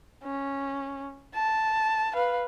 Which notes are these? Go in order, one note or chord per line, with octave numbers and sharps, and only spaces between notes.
C#4
A5
B4 F5